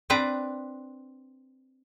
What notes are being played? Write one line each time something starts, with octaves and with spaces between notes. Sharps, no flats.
C4 D4 B4 A#5